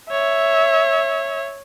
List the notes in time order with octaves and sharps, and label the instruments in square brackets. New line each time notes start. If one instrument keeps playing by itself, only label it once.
[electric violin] C#5 [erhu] E5